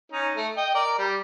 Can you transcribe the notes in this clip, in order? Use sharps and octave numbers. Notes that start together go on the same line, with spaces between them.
C#4 D#4
A3
D#5 G5
A#4 D5
G3 G4